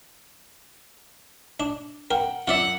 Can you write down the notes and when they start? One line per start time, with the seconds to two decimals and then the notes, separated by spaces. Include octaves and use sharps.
1.60 D4
2.11 A#4 F#5 G5
2.48 F#2 F4 D5 E5 F#5